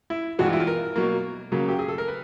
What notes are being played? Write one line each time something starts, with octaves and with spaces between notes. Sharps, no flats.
E4
G2 E3 G#3 B3 F#4
F4
E4
F4
A#4
B2 F#3 A#3
C#3 F#3 A#3
G4
G#4
A4
A#4
B4